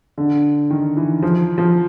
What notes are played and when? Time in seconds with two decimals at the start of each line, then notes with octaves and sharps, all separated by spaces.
0.18 D3
0.71 D#3
0.97 E3
1.22 F3
1.58 F3